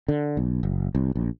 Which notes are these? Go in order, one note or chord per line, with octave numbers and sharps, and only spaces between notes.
D3
B1
F#1
C2
A#1